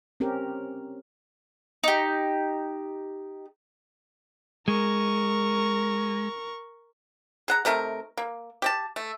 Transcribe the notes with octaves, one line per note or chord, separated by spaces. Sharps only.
C4 C#4 G4 A#4
D#4 G4
G#3 A#4 C#6
G#4 F#5 A#5
C3 A3 D#4 A#4
A#3
G4 C#5 A5
A3